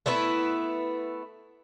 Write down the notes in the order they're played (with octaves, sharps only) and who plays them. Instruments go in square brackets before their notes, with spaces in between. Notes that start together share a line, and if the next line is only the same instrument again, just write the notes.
[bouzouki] A3 B3 E4 B4